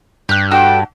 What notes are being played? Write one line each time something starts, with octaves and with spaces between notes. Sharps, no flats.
G2 G4 F#6
D4 F#4 A4 G5